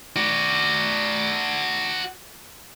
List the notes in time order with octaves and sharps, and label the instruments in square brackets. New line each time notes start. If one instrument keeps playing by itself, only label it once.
[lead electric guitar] F#4 D5